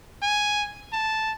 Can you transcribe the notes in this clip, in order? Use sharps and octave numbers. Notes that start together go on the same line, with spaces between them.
G#5
A5